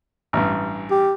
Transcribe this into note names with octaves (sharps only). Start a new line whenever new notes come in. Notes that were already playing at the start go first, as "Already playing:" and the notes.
A1 G2
G4